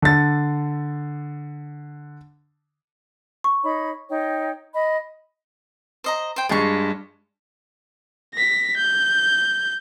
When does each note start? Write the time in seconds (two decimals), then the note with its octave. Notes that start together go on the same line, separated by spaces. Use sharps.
0.02 D3 A6
3.44 C#6
3.63 D#4 C#5 B5
4.10 D#4 C#5 G5
4.74 D#5 B5
6.04 C5 D#5 A#5
6.36 C5 G5
6.49 G2 G#3 F4 C#6
8.34 A#6 B6
8.76 G6